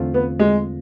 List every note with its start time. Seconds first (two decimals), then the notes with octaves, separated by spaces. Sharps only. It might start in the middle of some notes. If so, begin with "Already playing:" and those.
Already playing: E2 D3 A3 C4 F4
0.14 B3
0.39 G#3